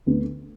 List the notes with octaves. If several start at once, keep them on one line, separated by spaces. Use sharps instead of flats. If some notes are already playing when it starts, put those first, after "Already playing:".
D2 D3 B3